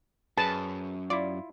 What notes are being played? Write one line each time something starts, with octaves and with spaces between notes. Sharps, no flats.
F#2 G#4 B4 A5
E4 F4 D5